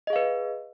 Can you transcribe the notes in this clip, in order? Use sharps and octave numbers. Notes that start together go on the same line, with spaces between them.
G#4 B4 D#5 F5